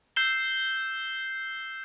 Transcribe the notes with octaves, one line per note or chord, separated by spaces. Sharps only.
E6 G6 C7 E7 G7